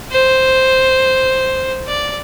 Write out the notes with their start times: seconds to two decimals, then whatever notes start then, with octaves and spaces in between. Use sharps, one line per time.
0.11 C5
1.87 D5